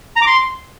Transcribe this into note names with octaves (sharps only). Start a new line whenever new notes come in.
A#5
D6
C6